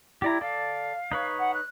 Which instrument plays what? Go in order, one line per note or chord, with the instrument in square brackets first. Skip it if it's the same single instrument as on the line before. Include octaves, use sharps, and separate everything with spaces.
[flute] E4 [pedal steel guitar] G4 D5 A#5
[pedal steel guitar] A4 D5 [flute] F5
[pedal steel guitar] D#4 B4 C#5
[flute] F#5
F#6